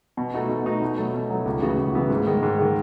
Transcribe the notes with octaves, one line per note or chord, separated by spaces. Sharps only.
B2
A3 D#4 F#4
B2
A3 D#4 F#4
B2
F#3 A3
B2
F#3 A3
C#2
C#3 E3 B3 F#4
C#2
C#3 E3 B3 F#4
G#2
D#3 G#3
G#2
D#3 G#3